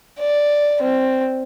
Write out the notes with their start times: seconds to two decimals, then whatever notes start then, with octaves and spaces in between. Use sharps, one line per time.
0.20 D5
0.82 C4